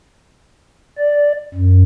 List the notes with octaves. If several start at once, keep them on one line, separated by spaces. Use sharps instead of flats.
D5
F#2